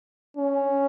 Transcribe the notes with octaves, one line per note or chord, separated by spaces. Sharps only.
C#4